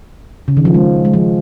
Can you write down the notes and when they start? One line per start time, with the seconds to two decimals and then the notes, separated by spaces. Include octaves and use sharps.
0.48 C#3
0.57 D#3
0.65 F3
0.74 G#3
1.05 G#3
1.14 F3